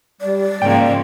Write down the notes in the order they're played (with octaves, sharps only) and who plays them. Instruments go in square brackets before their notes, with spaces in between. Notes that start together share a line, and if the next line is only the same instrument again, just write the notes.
[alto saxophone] G3 [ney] D5
[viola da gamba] G#2 C#3 F3 [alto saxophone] A#3 [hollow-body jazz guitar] G5